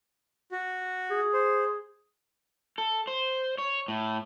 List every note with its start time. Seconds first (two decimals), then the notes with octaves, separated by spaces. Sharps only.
0.52 F#4
1.10 G#4
1.33 C5
2.78 A4
3.07 C5
3.58 C#5
3.88 A2